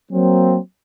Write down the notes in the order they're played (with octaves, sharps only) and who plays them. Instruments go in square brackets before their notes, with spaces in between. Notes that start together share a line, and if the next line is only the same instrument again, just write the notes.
[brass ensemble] F#3 A#3 C4